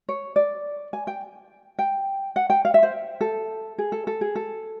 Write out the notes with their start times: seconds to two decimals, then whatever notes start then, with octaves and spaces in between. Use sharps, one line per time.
0.09 C#5
0.36 D5
0.93 G#5
1.07 G5
1.79 G5
2.36 F#5
2.50 G5
2.65 F5
2.74 E5
2.83 C5
3.21 A4
3.78 G#4
3.92 A4
4.07 A4
4.21 G#4
4.36 A4